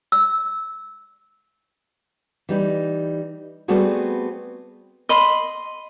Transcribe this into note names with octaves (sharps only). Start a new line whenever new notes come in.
E6
E3 G3 D#4
G3 A3 B3 C4 F#4 G#4
D#5 B5 C6